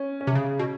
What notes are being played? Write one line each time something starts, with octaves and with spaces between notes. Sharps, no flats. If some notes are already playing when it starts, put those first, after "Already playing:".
Already playing: C#4
C#4
C3
C#3
B2